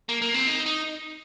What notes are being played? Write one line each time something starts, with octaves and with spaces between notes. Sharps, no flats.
A#3
A#3
C4
D#4
D#4